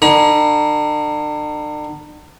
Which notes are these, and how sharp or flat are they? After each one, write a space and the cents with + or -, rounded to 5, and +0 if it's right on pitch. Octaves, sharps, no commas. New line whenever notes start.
D3 +40 A#5 +45